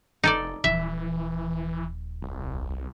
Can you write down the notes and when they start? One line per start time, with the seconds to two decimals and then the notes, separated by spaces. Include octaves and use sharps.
0.24 F1 D#4 A4 D5
0.64 D#1 E3 F3 E5
2.22 C2